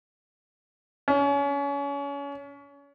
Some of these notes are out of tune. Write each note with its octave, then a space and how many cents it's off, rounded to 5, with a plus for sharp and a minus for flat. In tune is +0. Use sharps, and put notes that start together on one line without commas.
C#4 +30